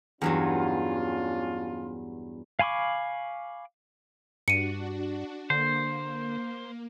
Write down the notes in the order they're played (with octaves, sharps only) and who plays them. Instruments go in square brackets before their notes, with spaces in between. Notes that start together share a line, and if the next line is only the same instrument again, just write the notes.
[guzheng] E2 G2 F#3 [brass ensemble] C#4 D4 F4
[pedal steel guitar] F5 G#5 B5 C#6 D6
[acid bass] G2 [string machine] D4 F#4 [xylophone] C#7 D#7
[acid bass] D3 [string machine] A#3 [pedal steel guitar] C5